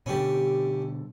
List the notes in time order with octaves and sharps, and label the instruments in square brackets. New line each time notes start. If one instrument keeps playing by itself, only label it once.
[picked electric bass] B2 D3 G3 [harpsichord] C#4 G4